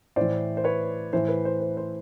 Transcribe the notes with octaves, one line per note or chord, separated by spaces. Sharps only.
A2 E3 C5 D5
C5
B4 C#5
A2 E3 C5
B4
C5
C5
C5